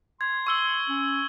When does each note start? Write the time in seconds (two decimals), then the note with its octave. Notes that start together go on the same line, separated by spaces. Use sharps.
0.21 C6 G#6
0.47 C#6 E6 G7
0.89 C#4